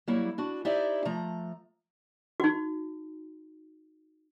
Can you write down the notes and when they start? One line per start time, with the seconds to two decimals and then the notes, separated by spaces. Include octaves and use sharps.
0.07 F#3 G3 A#3 E4
0.38 D4 F#4
0.65 D#4 E4 G4 C5 D5 E5
1.05 F3 A3 A#5
2.40 D#4 F#4